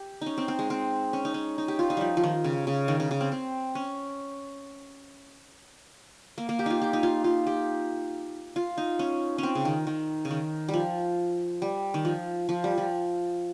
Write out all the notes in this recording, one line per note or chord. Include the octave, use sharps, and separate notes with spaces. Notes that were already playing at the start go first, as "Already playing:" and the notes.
Already playing: G4
C#4 D#4
C4
C4
G#3
C4
C#4
D#4
C#4
D#4
G4
F4
D#4
F3 G3
F3
D#3
C#3
C#3
D#3
C#3
C#3
C4
C4
C#4
A#3
A#3
G4
D#4 F4
G4
D#4
F4
F4
G4
F4
D#4
C#4
C4 C#4
C#3
D#3
D#3
C#3
D#3
G3
F3
G3
D#3
F3
F3
G3
F3